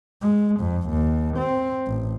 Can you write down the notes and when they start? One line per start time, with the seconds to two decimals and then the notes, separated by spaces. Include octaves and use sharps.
0.22 G#3
0.60 F2
0.89 D#2
1.37 C4
1.87 A1